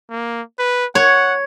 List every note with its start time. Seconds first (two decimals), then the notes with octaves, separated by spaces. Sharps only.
0.10 A#3
0.59 B4
0.95 C#5 F#5